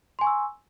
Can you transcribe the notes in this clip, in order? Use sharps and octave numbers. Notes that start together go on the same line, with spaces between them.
G#5 C6 C#6 E6